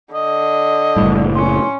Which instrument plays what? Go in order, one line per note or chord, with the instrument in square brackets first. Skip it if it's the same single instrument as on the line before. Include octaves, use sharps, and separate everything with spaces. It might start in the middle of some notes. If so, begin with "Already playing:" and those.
[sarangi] D3 [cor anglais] D#5
[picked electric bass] F#1 A2 [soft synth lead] G3
[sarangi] C#4 [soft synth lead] C6